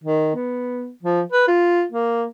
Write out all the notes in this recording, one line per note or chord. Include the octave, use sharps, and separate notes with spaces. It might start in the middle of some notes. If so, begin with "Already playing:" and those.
D#3
B3
F3
B4
F4
A#3